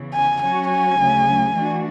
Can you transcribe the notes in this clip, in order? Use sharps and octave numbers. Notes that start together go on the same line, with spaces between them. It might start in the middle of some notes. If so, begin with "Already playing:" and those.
Already playing: E2 C#3 E3
G#5
F#3 C#4 F#4 C#5 G#5
G#5
D2 C#3 F#3 A3
E3 A3 D4 F#4